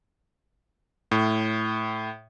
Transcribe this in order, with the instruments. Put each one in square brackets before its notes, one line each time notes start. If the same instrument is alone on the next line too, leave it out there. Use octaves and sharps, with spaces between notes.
[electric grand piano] A2